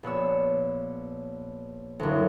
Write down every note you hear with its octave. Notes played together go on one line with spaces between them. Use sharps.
A#1 B3 C#5 E6
F#1 D2